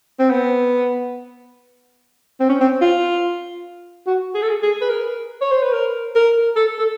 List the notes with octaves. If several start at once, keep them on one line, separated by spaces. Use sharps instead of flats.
C4
B3
C4
C#4
C4
F4
F#4
G#4
A4
G#4
G#4
B4
A#4
C#5
C5
B4
A#4
A#4
A4
A4